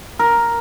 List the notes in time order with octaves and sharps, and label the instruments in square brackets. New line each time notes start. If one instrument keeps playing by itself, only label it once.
[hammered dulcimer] A#4